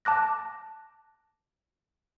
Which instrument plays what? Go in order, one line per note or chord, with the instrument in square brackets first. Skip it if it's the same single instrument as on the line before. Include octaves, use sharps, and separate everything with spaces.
[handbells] A5 D6 F#6 A#6